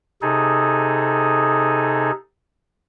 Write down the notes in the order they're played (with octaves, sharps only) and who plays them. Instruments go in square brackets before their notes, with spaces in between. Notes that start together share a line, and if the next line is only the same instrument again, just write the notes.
[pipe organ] C3 D#4 G#4 A4